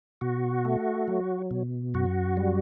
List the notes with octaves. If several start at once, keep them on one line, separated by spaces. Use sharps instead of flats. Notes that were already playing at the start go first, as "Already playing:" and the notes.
B2 F#4
A3
F#3
B2
F#2 F#4
G3